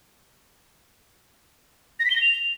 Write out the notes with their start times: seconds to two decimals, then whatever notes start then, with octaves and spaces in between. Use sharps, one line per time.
2.00 A#6
2.05 B6
2.10 G7
2.16 A#6
2.21 F7